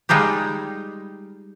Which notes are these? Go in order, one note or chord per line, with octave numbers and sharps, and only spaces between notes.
G3 G#3 D#4 F4 G4